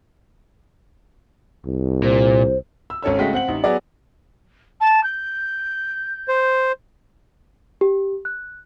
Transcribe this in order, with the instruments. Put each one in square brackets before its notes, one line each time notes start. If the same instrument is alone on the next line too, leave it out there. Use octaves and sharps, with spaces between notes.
[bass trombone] C2
[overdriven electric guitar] A#2 [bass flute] C5
[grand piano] E6
G#1 C#4 A4 C#5 E6
C#3 G#3 A3 F#4 G5 B6
C4 F#5 F#7
A1 D#4
F#3 B3 G#4 D5
[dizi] A5
G6
[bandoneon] C5
[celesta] G4
F#6